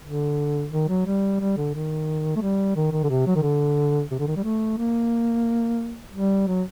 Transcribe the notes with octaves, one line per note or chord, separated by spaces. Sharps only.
D3
D#3
F#3
G3
G3
D3
D#3
A3
G3
D#3
D#3
D3
C3
F#3
D#3
D3
C3
D3
D#3
G3
A3
A#3
G3
F#3